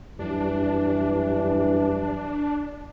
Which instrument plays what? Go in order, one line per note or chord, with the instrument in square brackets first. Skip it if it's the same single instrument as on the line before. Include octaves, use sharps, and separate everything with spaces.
[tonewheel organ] F#2 G3 [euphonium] E3 [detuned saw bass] D4